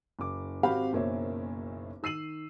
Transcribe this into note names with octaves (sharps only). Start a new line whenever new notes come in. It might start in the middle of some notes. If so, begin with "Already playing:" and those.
F#1 D6
G#1 C4 F#4 G4 F5 B5
F#1 B1 A#3 C5 C#5 E5
D#3 E6 C7 D#7 F#7